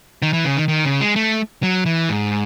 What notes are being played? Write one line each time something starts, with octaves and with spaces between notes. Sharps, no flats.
D#3
E3
C#3
D#3
D#3
C#3
G#3
A3
F#3
E3
G#2